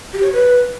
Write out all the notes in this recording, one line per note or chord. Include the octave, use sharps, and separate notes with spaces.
G4
C#5
B4